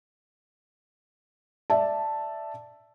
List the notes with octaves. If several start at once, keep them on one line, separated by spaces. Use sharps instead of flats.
D5 E5 A5